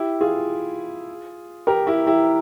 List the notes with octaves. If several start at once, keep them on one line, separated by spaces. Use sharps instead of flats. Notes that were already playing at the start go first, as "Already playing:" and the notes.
Already playing: E4 G4
F4 G#4
G4 A#4
E4 G4
E4 G4